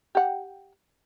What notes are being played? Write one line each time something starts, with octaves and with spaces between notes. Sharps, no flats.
G4 F#5